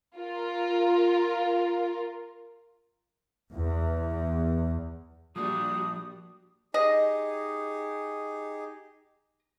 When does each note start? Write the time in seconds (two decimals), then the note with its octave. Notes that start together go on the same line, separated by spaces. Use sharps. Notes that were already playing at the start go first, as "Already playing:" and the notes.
0.18 F4 A#4
3.51 E2
5.36 F3 G3 A#3 D4 F#4 D#6
6.74 D#4 G4 G#4 D#5